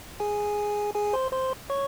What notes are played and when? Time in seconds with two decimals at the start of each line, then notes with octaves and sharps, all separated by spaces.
0.20 G#4 G#5
0.95 G#4 G#5
1.13 C5 C6
1.32 C5 C6
1.70 C#5 C#6